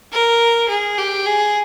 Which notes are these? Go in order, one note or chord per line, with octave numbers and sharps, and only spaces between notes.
A#4
G#4
G4
G#4